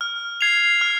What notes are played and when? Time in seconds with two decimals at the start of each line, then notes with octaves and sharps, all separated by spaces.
0.01 F6
0.41 G#6 C7 F7
0.81 F6